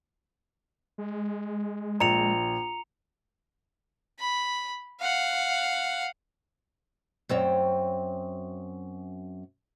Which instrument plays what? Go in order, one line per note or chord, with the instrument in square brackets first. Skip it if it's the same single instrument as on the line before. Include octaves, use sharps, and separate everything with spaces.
[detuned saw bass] G#3
[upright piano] A#1 [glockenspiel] A#5 C#7 F7
[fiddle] B5
F5 F#5
[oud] F#2 C4 C#5